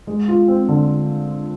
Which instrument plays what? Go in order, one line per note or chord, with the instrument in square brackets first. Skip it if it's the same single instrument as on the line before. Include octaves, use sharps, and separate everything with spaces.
[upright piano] G#3
F4
C4
D3